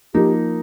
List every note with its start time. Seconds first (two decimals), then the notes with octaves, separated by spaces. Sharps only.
0.14 F3 A#3 D#4 G4